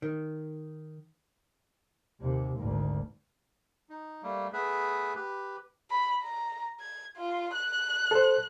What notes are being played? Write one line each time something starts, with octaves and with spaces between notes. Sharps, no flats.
D#3
D#2 C3
G#1 D2
D#4
G3 A3 A#3
A3 B3 G#4 B4 E5
G4 B4
B5
A#5
G#6
F4
F#6
A4 C5